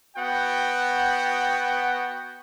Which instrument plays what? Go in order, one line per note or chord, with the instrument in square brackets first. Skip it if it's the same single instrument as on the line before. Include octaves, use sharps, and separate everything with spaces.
[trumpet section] B3 F#4 F#5 G5